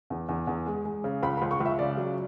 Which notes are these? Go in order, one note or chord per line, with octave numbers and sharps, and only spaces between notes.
E2
E2
E2
G#3
G#3
C#3
C#2 B5
B5
C#2
C#6
C#2
E5
C#3 D5
F#3